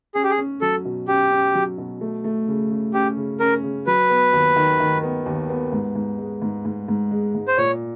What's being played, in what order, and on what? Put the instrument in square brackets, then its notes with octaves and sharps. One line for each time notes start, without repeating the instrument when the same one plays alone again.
[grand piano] C#4 [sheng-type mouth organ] G#4
[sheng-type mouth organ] G4
G#4
[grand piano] C#4
[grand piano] F#3 [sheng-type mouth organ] A4
[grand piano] B2
[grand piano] C#4 [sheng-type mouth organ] G4
[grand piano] C#4
F#3
B2
A3
A3
C#3
C#3
[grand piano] C#4 [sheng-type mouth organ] G4
[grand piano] C#3
[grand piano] C#4 [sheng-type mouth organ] A#4
[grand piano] C#3
[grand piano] F#3 [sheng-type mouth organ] B4
[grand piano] B3
D#2
D#3
D#3
B3
D#2
B3
G#2
G#2
G#3
G#2
G#2
G#2
G#3
G#2
[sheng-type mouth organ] C5
[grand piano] A#2 [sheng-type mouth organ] C#5